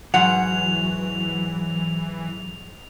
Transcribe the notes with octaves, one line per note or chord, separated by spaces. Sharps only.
G#2 E3 F#3 F#5 F7